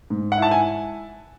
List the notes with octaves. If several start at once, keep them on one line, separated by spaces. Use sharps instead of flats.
G#2
F#5
E4 A5
G#5